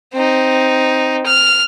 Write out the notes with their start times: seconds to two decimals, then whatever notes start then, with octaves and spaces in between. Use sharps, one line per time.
0.14 C4 D#4
1.26 F6